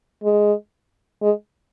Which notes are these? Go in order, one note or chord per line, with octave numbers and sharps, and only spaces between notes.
G#3
G#3